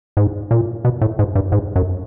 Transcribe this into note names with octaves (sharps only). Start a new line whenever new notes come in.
G#2
A#2
B2
A2
G#2
G2
G#2
F#2